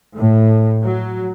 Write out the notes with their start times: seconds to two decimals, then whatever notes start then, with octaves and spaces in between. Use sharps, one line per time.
0.16 A2
0.83 F#3